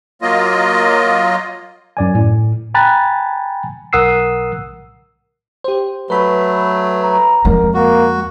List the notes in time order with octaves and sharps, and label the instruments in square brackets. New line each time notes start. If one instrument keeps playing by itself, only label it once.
[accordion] F#3 A#3 F4 D#5
[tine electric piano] F#2 D5 G#5
A2
G5 G#5 A#5 B5 F#6 A6
B1 A#4 F#5 D#6 E6 C7
[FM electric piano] G4 C5
[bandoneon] F#3 A3 [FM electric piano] B4 B5
[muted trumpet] A#5
[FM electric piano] F2 [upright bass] G#3 [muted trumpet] A#4
[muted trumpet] A#3 [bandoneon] F#4